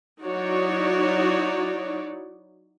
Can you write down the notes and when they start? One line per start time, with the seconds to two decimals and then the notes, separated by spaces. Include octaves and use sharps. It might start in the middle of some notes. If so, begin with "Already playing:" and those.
0.23 F#3 D#4 E4 F#4 C#5 D5